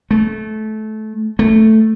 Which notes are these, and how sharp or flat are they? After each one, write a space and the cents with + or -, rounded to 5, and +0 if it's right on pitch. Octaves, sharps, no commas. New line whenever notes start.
A3 -20
A3 +0